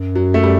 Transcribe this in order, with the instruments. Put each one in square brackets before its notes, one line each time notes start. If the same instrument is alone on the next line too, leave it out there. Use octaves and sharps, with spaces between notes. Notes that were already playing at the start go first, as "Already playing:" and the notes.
Already playing: [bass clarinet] F#2
[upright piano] F#3
A3
G3